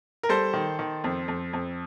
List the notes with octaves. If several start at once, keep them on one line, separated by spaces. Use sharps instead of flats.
A#4
G3 A4 C5
D#3
D#3
F2
F2
F2